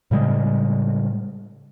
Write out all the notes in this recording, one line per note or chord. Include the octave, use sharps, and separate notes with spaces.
A2 C#3 G3 G#3